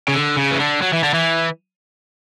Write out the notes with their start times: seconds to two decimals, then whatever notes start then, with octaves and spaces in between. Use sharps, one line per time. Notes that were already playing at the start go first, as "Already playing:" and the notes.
0.08 C#3
0.14 D3
0.37 C#3
0.51 E3
0.60 D3
0.82 F#3
0.94 E3
1.04 D3
1.14 E3